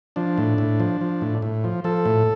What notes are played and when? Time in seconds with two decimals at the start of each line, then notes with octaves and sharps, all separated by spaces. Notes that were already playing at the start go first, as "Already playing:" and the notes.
0.16 F3 D4
0.38 A2
0.58 A2
0.80 F3
1.01 F3
1.21 A2
1.42 A2
1.64 F3
1.84 F3 A4
2.05 A2